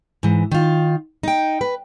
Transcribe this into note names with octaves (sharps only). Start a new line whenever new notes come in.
G#2 E3
D#3 F4
D#4 G5
B4